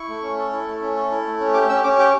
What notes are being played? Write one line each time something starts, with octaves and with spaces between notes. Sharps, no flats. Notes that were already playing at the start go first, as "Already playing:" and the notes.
Already playing: E4 C#6
A3
C#4
A4
E4
A3
C#4
A4
E4
A3
C#4
G4 D6
C#4 E6
C#4 D6
G4 D6